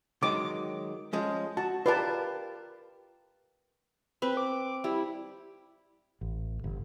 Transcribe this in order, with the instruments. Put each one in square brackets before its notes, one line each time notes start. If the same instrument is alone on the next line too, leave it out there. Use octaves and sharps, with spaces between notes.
[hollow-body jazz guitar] D#3 F#3 G#3 [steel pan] D6
[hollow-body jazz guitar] F3 G#3 C#4
[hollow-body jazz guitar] F#4 [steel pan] A5
[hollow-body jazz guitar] F4 G4 A#4 [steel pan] B4 D5 A5
[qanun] C4 [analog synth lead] B4
[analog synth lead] D6
[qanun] G3 [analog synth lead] E4
[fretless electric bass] A1
G1